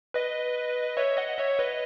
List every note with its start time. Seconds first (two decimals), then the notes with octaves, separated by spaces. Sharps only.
0.14 B4 D#5
0.97 C#5 E5
1.18 D#5 F#5
1.39 C#5 E5
1.59 B4 D#5